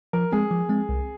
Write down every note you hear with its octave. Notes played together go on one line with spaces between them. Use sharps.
F3 A#4
G#3 C4 G#4
F3
G#3 C4
C2